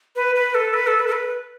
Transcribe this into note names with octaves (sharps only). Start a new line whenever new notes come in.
B4
B4
A4
B4
A4
B4
A4
B4